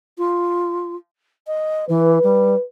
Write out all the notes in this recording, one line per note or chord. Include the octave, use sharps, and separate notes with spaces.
F4
D#5
E3 B4
G3